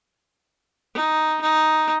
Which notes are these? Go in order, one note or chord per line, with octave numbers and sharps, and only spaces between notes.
D#4
D#4